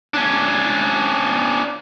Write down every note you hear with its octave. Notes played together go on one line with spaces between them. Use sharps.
C#4 D4